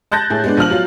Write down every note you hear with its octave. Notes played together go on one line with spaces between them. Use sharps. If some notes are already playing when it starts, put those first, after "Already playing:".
A5 F#6 G6 A6 A#6
A2 G#4
G#3 B3 D4
A#1 F3 F6 F#7
F#3 F4